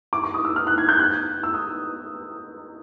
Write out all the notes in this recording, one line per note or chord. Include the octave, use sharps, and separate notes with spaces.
D6
D6
D#6
E6
F6
F#6
G#6
G6
F#6
E6
D#6